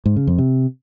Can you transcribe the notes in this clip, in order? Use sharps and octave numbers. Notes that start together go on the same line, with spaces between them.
G#2
C#3
F2
C3